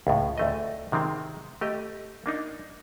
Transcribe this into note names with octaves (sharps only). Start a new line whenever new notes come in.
C#2 A2
D2 A3 D#5
C3 D#3 G#3 C4
A3 G4 D#5
A#3 D4 D#4